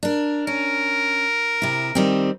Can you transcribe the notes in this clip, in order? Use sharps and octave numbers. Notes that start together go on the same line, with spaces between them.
D4 A#4
C#4 A#4
C3 E4
D#3 G3 C4